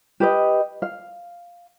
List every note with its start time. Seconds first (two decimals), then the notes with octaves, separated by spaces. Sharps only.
0.20 G4 B4 D#5
0.82 F5